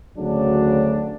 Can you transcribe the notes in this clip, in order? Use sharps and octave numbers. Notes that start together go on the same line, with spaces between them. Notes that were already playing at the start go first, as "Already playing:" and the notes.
D2 C#3 F#3 D4